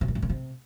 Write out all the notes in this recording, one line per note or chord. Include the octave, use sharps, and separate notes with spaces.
C3
A#2
A2
C#3
C3